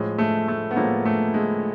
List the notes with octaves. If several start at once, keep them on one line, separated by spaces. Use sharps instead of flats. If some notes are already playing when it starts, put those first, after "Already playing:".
Already playing: A2 F3 G#3
A3
A3
B3
A2 F3 G#3 A#3
A3
G#3